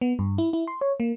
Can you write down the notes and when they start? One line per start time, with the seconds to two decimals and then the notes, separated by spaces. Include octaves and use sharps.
0.01 B3
0.19 G2
0.38 E4
0.53 E4
0.67 C6
0.81 C#5
1.00 A#3